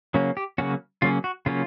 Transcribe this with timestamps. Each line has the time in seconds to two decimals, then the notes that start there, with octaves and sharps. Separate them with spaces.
0.14 C#3 F#3 A#3 C#4
0.37 G4
0.58 C#3 F#3 A#3 C#4 F#4
1.02 C#3 F#3 A#3 C#4 F4
1.24 F#4
1.46 C#3 F#3 A#3 C#4 F4